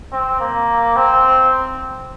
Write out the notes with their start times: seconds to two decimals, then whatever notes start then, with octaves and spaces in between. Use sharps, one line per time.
0.12 C4
0.40 A#3
0.96 C4